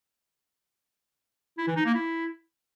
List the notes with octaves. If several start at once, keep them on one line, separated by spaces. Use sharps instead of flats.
E4
E3
D#4
A#3
E4